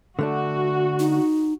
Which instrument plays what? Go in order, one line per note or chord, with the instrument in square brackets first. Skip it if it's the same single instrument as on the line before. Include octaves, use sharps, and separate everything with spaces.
[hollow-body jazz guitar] D3 A3 D4 [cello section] F#4
[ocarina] D#4